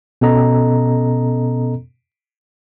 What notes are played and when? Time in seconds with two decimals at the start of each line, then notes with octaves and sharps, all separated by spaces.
0.21 B2 B3 C#4 A4 D#5 A#5